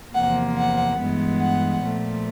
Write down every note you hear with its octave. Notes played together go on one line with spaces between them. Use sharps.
E2 C3 F3 A#3 F#5
F#5
G2 E3 G#3 B3
F#5
A#2 F3 A3